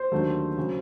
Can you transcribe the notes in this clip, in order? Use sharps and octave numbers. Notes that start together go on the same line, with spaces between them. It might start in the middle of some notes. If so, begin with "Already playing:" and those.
Already playing: C5
D#2 D3 F#3 A3
C#3 F#3